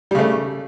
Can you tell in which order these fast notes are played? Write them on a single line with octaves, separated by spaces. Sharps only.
G3 C#3 A3